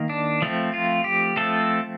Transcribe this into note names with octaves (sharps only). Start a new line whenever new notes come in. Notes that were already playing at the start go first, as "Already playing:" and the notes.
Already playing: D#3 A#3
D4
F3 A3 C4
F4
G4
F3 A3 C4 A4